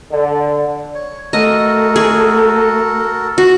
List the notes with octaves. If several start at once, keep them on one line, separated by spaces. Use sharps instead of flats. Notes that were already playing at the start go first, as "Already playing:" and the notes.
D3
C#5
A3 F#4 A4 A#4 D#5
G#4
F#4